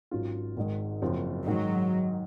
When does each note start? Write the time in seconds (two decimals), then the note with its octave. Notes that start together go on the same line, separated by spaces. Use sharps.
0.11 G#1 G#2 F#3 C#4 F4
0.56 G#1 G#2 D#3 G#3
1.02 F#1 F#2 F3 C4
1.46 G#2 D#3 F#3 G#3 D#4